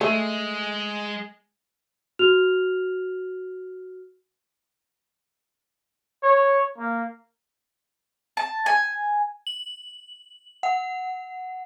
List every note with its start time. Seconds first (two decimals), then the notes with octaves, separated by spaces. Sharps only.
0.01 G#3 A3
2.19 F#4 F6 F7
6.23 C#5
6.78 A#3
8.37 A5
8.66 G#5
9.47 F#7
10.63 F#5